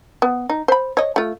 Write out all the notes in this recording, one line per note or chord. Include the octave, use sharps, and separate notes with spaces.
B3
D#4
C5 B5
C#5 D#5
A3 F4